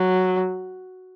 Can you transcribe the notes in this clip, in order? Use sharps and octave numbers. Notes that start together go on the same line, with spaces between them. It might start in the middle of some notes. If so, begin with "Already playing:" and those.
Already playing: F#3